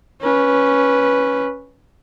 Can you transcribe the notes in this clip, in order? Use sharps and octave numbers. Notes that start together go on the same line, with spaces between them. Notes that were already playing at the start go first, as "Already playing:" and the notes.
C#4 B4